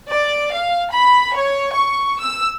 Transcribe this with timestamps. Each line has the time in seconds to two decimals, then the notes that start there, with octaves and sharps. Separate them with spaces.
0.10 D5
0.53 F5
0.91 B5
1.35 C#5
1.75 C#6
2.21 E6